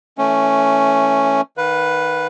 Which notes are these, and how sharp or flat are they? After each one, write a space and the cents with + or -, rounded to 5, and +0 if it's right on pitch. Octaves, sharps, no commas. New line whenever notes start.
E3 -15 A3 +5 C#4 +0
D#3 +0 B4 +0 F5 +35